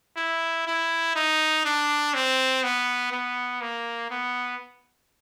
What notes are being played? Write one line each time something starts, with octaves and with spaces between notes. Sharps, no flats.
E4
E4
D#4
D4
C4
B3
B3
A#3
B3